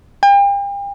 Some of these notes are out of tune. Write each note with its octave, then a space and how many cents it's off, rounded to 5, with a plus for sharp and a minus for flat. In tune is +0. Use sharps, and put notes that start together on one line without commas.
G5 +40